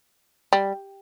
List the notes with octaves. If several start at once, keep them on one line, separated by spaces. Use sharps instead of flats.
G3